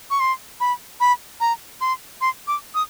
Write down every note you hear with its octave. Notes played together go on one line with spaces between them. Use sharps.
C#6
C6
B5
B5
A#5
C6
C6
D6
D#6